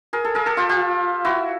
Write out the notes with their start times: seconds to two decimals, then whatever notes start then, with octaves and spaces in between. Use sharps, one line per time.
0.13 G#4 A#4
0.25 A4
0.35 G#4 A#4
0.46 G4 A4
0.57 F4 G4
0.69 F4 G4
1.25 E4 F#4